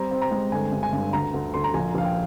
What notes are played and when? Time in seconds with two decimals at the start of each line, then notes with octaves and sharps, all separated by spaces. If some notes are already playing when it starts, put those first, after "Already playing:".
Already playing: G3 C4 A#5
0.11 C4
0.22 A#5
0.31 G#3
0.52 G1 G#5
0.72 G2
0.83 G#5
0.93 G2
1.13 D2 A#5
1.34 D2
1.54 D2 C6
1.64 A#5
1.74 A#1 G#5
1.95 A#1 F5
2.05 G5